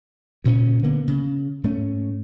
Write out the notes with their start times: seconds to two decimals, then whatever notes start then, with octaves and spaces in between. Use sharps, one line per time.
0.44 D2 A#2 C#3 C#4
0.83 D3 A#3 B3
1.08 C#3
1.64 G#2 A3 C#4